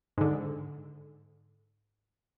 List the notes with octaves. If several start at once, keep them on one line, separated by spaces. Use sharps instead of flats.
G#2 D3